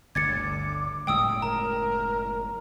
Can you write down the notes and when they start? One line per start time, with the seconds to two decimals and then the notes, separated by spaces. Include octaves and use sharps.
0.15 G1 D2 D3 D6 G#6 A6 C#7
1.07 F#1 A2 G#3 G5 D#6 E6
1.42 A#4 A#5